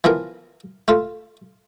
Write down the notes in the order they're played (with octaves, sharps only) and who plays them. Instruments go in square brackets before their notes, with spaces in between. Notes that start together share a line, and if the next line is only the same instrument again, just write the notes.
[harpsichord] E3 F3 B3 A#4
A3 F4